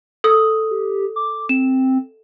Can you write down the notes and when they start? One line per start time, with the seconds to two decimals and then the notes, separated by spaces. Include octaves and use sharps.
0.24 A4 D#6
0.71 G4
1.16 D6
1.49 C4 E7